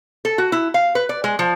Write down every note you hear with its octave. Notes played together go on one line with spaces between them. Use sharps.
A4
F#4
E4
F5
B4
D5
G#3
F3